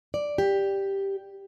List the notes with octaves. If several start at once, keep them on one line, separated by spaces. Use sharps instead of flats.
D5
G4